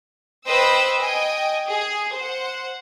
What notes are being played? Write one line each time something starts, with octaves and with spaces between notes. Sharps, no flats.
B4 C5 D#5 G5 E6
D#5 G5 G#5
G#4
C5 F#5